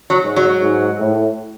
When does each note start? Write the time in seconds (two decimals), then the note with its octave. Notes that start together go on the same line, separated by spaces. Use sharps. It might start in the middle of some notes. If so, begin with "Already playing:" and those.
0.10 F#3
0.23 G#2
0.36 F#3
0.61 G#2
0.99 A2